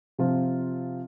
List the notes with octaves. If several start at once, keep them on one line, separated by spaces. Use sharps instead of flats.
C3 F3 C4 F4